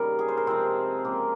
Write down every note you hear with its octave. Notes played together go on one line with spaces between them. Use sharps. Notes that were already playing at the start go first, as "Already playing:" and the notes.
Already playing: A#2 C#3 G3 D#4 A#4
G#4
C5
A#4
C3 F3 G#3 C4
C#3 F3 G#3 A#3